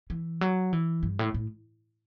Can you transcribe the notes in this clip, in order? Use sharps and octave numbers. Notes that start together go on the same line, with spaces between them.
E3
F#3
E3
G2
A2
A2